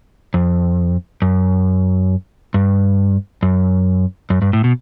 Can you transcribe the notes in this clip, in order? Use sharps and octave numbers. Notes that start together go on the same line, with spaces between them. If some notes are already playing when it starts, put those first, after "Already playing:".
F2
F#2
G2
F#2
F#2
G2
A2
B2